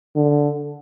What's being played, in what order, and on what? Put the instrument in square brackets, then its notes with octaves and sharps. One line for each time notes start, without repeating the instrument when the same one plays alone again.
[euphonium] D3